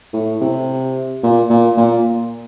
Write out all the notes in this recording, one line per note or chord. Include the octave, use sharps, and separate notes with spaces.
A2
C3
A#2
A#2
A#2